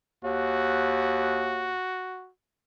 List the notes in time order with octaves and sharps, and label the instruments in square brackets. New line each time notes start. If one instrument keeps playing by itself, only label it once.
[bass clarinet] D#2 [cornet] F#4